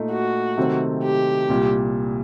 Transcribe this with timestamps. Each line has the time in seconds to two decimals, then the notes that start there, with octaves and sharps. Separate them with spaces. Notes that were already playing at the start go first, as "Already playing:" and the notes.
Already playing: A#2 A3 D#4
0.11 F#4
0.57 C3 D#3 F#3 A3 C4
1.04 G4
1.49 C2 A#2 G3